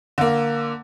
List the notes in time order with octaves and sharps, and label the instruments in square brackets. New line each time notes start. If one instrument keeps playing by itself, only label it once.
[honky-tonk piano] D3 A#3